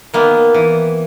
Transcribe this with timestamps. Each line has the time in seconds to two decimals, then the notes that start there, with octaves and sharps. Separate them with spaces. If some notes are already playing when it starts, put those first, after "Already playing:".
0.14 D#3 A#3 B3
0.54 E3